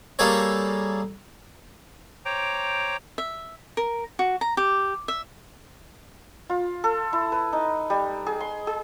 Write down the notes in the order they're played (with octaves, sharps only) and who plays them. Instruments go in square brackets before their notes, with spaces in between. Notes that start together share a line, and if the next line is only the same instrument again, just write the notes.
[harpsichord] G3 A#3 G#4 A4 C#5
[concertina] C5 C#5 G5 A#5 D6
[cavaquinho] E5
A#4
F#4
A#5
G4
E5
[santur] F4
A4
E4
B4
D#4
G3
G#4
C6
G#4